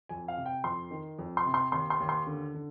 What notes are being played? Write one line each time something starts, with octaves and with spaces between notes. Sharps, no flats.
F2 G#5
F5
C3
G5
F2 C6
D#3
F2
C6
C3
C6
D#2 C6
C6
D#2
C6
D3
D3